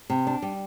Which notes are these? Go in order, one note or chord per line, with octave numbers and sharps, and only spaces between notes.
C3
D4
G3